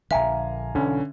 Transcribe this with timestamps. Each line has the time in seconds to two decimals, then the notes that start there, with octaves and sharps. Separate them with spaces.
0.11 A#1 D3 E5 F5 G#5 A#5
0.75 B1 D3 E3 C#4